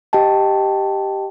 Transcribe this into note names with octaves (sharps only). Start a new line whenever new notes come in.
G4 D#5 G5 A5